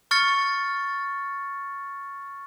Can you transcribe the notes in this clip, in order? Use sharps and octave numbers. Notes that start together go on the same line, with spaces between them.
C#6 F6 A6 C#7